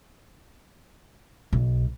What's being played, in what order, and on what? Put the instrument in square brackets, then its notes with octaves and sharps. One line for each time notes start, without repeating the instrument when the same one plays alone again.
[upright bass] B1